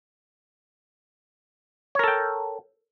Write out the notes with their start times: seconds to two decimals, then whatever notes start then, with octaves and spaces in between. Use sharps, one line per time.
1.95 C#5
1.99 A#4
2.04 A4
2.08 G5